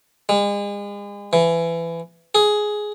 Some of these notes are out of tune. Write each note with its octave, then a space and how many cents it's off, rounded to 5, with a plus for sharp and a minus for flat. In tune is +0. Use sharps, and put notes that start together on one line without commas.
G#3 -40
E3 +20
G#4 +10